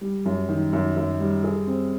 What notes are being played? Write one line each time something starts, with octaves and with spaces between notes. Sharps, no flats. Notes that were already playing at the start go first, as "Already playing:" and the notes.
G3
F#2
D#3
F#2
F#2
G3
G#4
C4